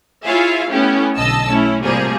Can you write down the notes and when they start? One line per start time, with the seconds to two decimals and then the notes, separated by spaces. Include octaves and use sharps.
0.24 E4 F4 G#4 C#5 E5 F5
0.69 A3 B3 C#4 E4 G4
1.16 B1 D3 D#5 A5 E6
1.48 A3 C#4 E4
1.83 A2 C3 F3 G3 A#3 G#4